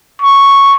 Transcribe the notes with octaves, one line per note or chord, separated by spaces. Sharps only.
C#6